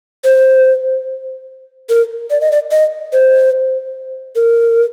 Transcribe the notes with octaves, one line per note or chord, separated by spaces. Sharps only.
C5
A#4
D5
D#5
D5
D#5
C5
A#4